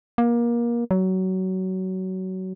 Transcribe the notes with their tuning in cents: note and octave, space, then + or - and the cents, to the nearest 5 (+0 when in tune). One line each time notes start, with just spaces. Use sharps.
A#3 +25
F#3 +20